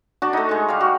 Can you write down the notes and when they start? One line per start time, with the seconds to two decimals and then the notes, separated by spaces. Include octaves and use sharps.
0.22 D4 F#4 A5
0.33 A3 D#4
0.49 G#3 C#6
0.68 G3 F5
0.81 F#4